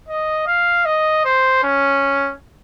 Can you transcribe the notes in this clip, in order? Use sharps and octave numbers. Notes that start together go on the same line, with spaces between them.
D#5
F5
D#5
C5
C#4